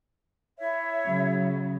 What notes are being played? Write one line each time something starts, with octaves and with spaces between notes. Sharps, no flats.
E4 C#5 E5
C#3 F#3